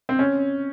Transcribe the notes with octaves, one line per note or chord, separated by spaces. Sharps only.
C4
C#4